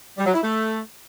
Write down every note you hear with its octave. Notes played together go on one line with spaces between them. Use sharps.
G3
F#3
E4
A3